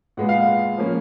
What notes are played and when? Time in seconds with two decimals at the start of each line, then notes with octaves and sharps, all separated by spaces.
0.17 A#2 G#3 B3 F#5
0.29 F5
0.40 F#5
0.78 F3 A#3 C#4